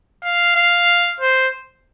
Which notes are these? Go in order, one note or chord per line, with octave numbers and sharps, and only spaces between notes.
F5
F5
C5